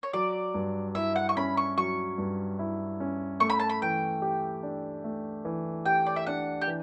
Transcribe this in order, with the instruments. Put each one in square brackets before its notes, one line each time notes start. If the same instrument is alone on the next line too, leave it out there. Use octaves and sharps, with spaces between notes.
[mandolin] C#5
[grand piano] F#3 [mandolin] D5
[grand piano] G2
[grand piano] E4 [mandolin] E5
[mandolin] F#5
C#6
[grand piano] C#4 [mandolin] B5
[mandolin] C#6
[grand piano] F#3 [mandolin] C#6
[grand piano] G2
E4
C#4
[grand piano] A3 [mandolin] C#6
[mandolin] B5
A5
B5
[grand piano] E3 [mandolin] G5
[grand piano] G4
D4
A3
E3
[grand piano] G4 [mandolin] G5
[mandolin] D5
E5
[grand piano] D4 [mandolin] F#5
[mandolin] G4
[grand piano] E3